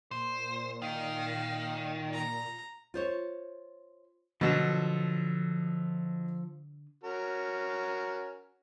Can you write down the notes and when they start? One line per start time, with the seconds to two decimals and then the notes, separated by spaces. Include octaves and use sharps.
0.11 A#2 C5
0.82 D#3 F5
2.13 A#5
2.94 F4 C5 C#5
4.41 B2 D3 F3 F#3 A4
7.04 C#4 F#4 A#4